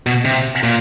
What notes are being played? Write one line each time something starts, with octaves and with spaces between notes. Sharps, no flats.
B2
C3
A#2